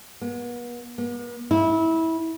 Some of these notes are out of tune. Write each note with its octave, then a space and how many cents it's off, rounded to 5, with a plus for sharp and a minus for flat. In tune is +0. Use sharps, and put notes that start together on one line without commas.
B3 -40
B3 -45
E4 -20